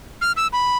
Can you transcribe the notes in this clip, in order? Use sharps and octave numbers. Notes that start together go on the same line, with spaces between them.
F6
E6
B5